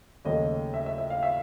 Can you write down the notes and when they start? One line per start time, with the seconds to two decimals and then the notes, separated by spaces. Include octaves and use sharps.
0.25 D#2 C#3 F#3 A3 D#5
0.74 E5
0.86 E5
0.98 E5
1.10 F5
1.23 E5